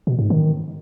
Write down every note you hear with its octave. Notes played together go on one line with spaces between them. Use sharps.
B2
G#2
D#3